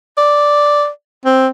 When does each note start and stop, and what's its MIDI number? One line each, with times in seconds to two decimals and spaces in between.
0.18 0.88 74
1.25 1.48 60